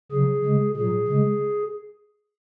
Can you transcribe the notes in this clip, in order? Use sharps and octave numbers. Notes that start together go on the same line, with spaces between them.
C#3 F#3 G#4
C#3 G#3
A#2 F#3 G#4
C#3 G#3